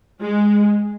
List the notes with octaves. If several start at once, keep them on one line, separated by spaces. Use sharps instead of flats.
G#3